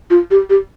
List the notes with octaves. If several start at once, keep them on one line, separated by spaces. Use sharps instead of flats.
F4
G4
G4